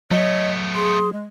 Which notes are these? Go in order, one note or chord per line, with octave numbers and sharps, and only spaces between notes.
F#3 A3 B3 C#5 D#5
G#4 C6
G#3